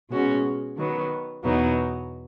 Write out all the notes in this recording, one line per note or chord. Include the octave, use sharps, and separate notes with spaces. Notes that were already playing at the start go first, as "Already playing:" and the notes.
B2 G#3 C#4 F#4
D#3 F#3 B3
E2 B2 F#3 B3 D#4